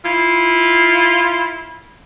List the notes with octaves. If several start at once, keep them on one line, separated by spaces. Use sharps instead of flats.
E4 F4